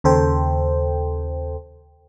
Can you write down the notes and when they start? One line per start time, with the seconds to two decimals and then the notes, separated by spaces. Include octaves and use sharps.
0.04 D#2 C#3 A4 C5 G5